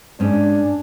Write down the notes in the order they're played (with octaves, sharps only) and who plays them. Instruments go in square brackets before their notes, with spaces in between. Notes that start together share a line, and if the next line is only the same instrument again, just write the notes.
[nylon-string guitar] G#2 C#4 [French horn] D4